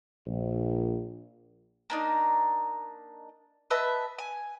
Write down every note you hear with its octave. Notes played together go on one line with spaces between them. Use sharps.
A#1
A#3 D4 D#4
B4 D#5 E5 A5
G#5